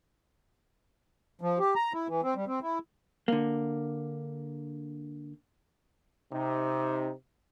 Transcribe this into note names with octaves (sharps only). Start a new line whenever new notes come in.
F3
G4
A#5
E4
E3
C4
G3
C4
E4
D3 A#3
C3 D#4